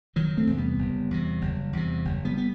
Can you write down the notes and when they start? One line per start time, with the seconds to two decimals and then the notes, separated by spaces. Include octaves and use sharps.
0.16 F#1 D#3 F#3
0.37 A3 C4
0.47 E2 C3
0.57 G3 B3
0.78 F#1
1.11 E2 C3
1.41 F#1
1.73 E2 C3
2.05 F#1
2.25 G3 B3
2.38 B3